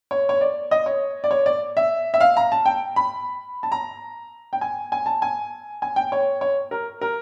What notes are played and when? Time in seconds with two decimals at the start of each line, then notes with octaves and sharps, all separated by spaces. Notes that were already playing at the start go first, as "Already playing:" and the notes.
0.11 C#5
0.29 C#5
0.41 D5
0.71 D#5
0.86 C#5
1.24 D5
1.31 C#5
1.46 D5
1.77 E5
2.14 E5
2.20 F5
2.37 A#5
2.52 A5
2.66 G5
2.96 B5
3.63 A5
3.72 A#5
4.53 G5
4.61 G#5
4.92 G#5
5.06 A5
5.22 G#5
5.82 G#5
5.96 G5
6.12 C#5
6.41 C#5
6.71 A#4
7.01 A#4